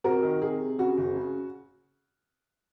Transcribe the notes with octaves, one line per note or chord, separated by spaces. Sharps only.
C2 F#4 A#4
D#3
C3 G#4
C3
C#3 F#4
F#1
C#3